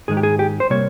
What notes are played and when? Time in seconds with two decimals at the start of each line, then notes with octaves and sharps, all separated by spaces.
0.08 G#2 D#3 G#3 G#4
0.17 G4
0.23 G#4
0.39 G4
0.60 C5
0.70 C3 G3 A#3 C#5